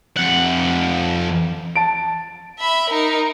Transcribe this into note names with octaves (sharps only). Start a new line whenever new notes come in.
F2 F#5
A5 D7
E5 B5
D#4 A#4